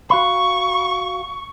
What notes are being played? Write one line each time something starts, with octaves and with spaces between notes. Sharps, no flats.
F#4 F5 B5 C#6